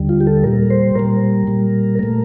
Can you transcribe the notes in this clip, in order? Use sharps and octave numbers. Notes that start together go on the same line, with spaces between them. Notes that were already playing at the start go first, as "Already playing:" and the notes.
Already playing: D#2 D3 G3
F4
G4
A4
A#2 G3 A#4
C5
A#2 G3 A#4
A#2 G3
A#2 A3 A#4